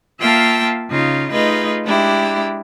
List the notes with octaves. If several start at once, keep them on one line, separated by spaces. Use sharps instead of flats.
A#3 F4 E5 G5 A5
C#3 D#4 F4
A3 D#4 F4 G#4 B4 D#5
G#3 D4 E4 G4